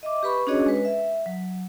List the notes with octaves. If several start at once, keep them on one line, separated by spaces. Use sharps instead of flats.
D#5 E5 D6
G4 B4 B5 C#6
C#4 D4 F#4 G#4 C#5 D#5
G#3 B4
E5
F#3